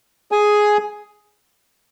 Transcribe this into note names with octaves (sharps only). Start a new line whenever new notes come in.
G#4 G#5